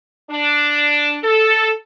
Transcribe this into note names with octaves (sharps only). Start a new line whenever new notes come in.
D4
A4